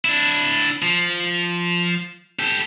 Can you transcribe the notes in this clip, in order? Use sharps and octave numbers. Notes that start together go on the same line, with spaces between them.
D4 E4
F3
G4 A4